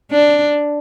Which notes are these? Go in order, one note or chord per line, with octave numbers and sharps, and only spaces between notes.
D4